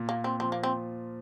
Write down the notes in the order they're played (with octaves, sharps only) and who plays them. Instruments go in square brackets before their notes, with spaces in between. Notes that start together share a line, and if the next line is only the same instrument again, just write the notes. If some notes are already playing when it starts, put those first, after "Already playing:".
Already playing: [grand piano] A#2
[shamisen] A#3
C4
[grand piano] F3 [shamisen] C4
[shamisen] A#3
C4